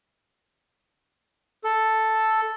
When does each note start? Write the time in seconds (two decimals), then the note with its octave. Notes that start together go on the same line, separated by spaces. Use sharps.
1.64 A4